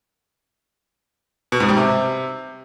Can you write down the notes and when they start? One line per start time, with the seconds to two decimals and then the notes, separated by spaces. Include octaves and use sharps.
1.52 B2
1.60 G#2
1.69 G3
1.77 C3